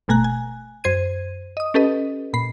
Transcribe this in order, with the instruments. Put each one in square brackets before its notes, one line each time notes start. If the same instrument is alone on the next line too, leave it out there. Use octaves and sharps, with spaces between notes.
[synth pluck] G1 B2 A3 G#5 A#5 F#6
G#5
F#2 C5 G#6 D#7
D#5 D#6
C#4 G4 A4 B4 D#5
A#2 B5 C7